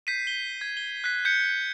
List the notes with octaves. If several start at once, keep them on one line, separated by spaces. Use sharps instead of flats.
G6 B6 C7 D#7
G7
G#6
G7
F#6 B6
G6 B6 C#7